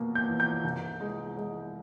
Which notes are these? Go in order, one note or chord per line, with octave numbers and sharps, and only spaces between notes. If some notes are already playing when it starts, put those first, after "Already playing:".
Already playing: B2 A#3
G6
E2
G6
C2
G#3
G#3